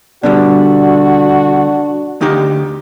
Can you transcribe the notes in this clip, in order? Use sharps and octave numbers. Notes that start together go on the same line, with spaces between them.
B2 D3 G3 D4 F#4
D2 D#4 G4